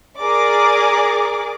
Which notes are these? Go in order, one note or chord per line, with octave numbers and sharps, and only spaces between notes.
G#4 A#4 D5 D6